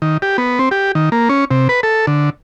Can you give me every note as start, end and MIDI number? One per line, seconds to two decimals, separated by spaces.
0.02 0.17 51
0.22 0.37 67
0.38 0.59 59
0.59 0.69 60
0.71 0.92 67
0.95 1.09 51
1.12 1.29 58
1.29 1.45 61
1.51 1.68 48
1.69 1.81 71
1.83 2.06 69
2.07 2.30 50